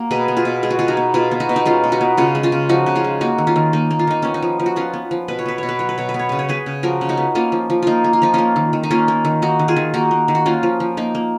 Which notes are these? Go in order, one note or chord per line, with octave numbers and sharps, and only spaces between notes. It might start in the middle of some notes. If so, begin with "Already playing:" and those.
Already playing: A#3 F#4
B2 G#4 B4
B3
F4 G#4
B2
G#3 G#4
F#4
B2 F4 G#4
D#4 F#4
B3
B2 F4 G#4
B3
D#4 F#4
B2
D#4
G#3 C#4 F4
B2
D#4 F#4
B3
C#3 C#4 F4
G#3
C#4 F4
C#3
F3 D#4 F#4
C#3
F4 G#4
G#3
A#3 D#4 F#4
D#3
C#4 F4
D#3
A#3 D#4
A#3
F4
D#3 D#4
B3 C#4
D#4
F3
F3
F#4
B3 C#4 F4
B3
F3
B2 B4
C#5
B3 B4
B2 C#5
B4
F#3 C#5
B4
B2 C#5
B4
B3
C#5
C#3 B4
C#5
B3 G#4 B4
C#3
F3 F#4 A#4
C#3
D#4 F#4
B3
A#3 C#4 F4
F3
F3
A#3 D#4 F4
A#3
F4
F3 D#4
A#3 C#4 F4
D#3
D#3
D#4
A#3 C#4 F4
A#3
D#3
A#3 D#4 F#4
D#3
F4 G#4
D#3
A#3 D#4 F#4
A#3
D#3
F#4
A#3 C#4 F4
F3
F3
A#3 D#4
A#3